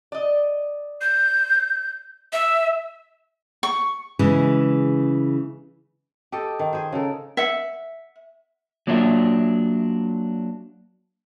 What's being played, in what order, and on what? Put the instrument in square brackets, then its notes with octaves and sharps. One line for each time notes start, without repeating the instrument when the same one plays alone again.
[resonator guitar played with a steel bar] D5 D#5
[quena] G6
E5
[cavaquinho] C#6
[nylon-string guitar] C#3 E3 G#3 G#4
[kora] G4 A4 D#5
D#3
G#4 C5
C#3 A4 A#4
[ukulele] E5 F#5
[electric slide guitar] F#3 A#3 D4 F4 D#5 E5